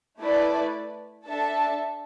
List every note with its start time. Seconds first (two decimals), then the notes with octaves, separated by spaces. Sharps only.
0.20 A3 E4 B4 D5
1.26 D4 A4 E5 A5